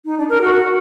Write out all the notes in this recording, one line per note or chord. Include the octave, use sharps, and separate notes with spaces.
D#4
D4
A#4
F#4